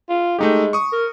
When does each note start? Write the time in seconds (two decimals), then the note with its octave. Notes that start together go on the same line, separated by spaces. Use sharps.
0.09 F4
0.39 G#3 A3 D#4 G4
0.73 C#6 D#6
0.92 A#4